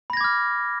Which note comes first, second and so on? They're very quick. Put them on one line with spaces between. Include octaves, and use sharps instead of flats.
B5 A#6 G#6 D6 F6